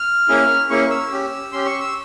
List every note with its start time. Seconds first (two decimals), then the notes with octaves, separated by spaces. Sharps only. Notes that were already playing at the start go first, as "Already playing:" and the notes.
Already playing: F6
0.28 A#3 C#4 E4 G#4
0.70 A#3 C#4 E4 G#4 C#6
0.91 E6
1.12 C#4 G4
1.52 C#4 G4 C6
1.66 C#6
1.80 E6